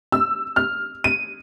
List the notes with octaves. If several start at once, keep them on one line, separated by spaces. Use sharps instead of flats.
E6
F6
D#7